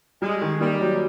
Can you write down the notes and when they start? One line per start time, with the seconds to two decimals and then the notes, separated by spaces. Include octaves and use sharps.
0.22 G3 G#3
0.42 D#3
0.60 G3 A#3
0.81 F#3